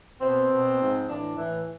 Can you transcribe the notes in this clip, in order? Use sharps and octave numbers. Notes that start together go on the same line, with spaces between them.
B2 C4
B2
G#2 F3
A2 E3 D4
A2 E3